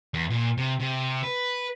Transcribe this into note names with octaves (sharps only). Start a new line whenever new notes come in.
E2
A#2
C3
C3
B4